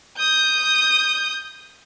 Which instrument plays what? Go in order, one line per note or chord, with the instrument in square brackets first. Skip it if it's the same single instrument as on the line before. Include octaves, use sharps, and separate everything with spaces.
[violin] D#6 G6